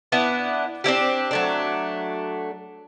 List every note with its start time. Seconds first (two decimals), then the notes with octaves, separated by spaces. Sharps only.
0.12 B3 D4 E4
0.84 C4 D4 E4 G4
1.31 F#3 A3 D4